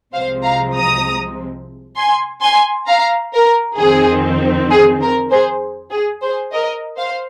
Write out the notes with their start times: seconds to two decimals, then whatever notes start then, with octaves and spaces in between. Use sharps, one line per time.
0.14 C2 C3 F3 G#3 C4 C5 F5
0.44 F5 A#5
0.75 A#5 D#6
1.96 G#5 C6
2.42 G#5 C6
2.88 F5 A#5
3.34 A#4
3.79 F2 D#3 C4 G#4
4.71 G#4
5.01 A#4
5.31 G#4 C5
5.91 G#4
6.23 G#4 C5
6.53 A#4 D#5
6.98 C5 F5